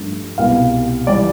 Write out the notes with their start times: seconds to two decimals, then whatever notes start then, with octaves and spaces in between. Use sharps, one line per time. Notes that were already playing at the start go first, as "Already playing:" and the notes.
Already playing: G2 F3 A3
0.38 C2 B2 B3 F5
1.07 E3 G3 D5